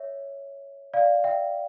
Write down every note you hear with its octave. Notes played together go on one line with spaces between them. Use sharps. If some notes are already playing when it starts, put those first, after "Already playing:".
Already playing: C#5 E5
D5 F5
E5 G5